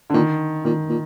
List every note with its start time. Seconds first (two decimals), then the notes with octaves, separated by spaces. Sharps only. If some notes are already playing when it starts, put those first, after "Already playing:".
0.10 D3
0.14 A#2 D#3
0.65 A#2 D#3
0.89 A#2